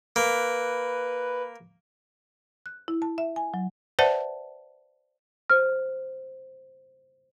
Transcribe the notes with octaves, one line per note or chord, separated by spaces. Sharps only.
A#3 B4
F#6
E4
A5
E5
G#5
F#3
B4 C5 D5 E5 F#5 A5
C5 F6